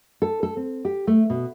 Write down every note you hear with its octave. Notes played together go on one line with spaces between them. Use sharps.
A4
A4
C4
G4
A3
B2